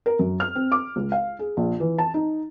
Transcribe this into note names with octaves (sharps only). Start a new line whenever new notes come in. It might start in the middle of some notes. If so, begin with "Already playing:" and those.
A#4
F#2
F6
C4
D6
C#2
F5
G#4
A#1
E3
A5
D#4